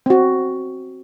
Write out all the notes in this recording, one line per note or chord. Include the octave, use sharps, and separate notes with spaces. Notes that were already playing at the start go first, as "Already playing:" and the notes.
C4 F#4